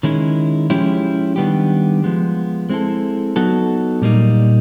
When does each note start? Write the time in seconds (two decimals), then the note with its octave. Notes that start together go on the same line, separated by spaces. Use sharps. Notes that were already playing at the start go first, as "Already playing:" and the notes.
0.03 D#3 G#3 C#4 E4
0.70 F3 G#3 C#4 E4 G4
1.36 D#3 G3 B3 D4 G4
2.04 F3 G#3 B3
2.69 G#3 C4 E4 A4
3.36 F#3 B3 D#4 F#4 A4
4.02 A#2 G3 A#3 D#4